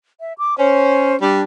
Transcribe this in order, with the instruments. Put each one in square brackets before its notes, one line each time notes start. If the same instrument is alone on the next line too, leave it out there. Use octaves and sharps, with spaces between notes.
[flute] E5
D6
[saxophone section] C#4 [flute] C5
[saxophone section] G3 [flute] D4